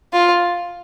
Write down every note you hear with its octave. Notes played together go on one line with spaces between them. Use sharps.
F4